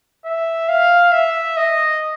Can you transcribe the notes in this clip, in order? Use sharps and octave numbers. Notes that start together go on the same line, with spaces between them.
E5
F5
E5
D#5